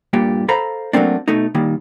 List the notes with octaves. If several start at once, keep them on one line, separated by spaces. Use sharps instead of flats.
G2 A#2 G4
A4 C5 F5 A#5 B5
F#3 A3 A#3 C4 D4
B2 A3 D#4
A#2 D#3 G3